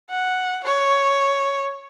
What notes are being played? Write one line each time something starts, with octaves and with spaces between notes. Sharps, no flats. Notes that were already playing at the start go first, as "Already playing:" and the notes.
F#5
C#5